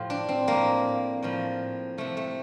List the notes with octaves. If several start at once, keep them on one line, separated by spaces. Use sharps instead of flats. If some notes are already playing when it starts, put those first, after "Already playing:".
Already playing: A2 F3 F4 G4
D4
C4
A2 F3 A#3
A2 F3
C3 F3 A3
A3